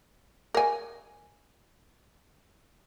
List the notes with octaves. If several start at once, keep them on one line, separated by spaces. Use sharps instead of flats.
A#4 G#5